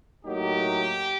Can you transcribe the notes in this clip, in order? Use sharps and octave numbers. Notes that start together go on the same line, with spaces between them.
A2 F#3 A#3 D#4 G4